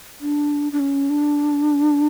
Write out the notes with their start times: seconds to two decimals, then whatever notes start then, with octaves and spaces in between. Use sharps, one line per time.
0.21 D4
0.72 D4
0.80 C#4
1.10 D4